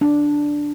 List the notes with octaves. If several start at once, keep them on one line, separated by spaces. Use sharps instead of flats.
D4